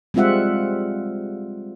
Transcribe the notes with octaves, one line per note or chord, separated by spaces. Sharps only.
G3 G#3 C4 F4 E5 F#5